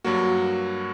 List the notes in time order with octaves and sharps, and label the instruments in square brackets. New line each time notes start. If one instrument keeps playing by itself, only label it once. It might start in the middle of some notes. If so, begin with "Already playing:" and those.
[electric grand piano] G2 F#3 A#3 F#4